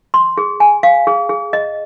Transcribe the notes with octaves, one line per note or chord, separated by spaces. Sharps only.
C6
G#4
G#5
F5
G#4
G#4
D#5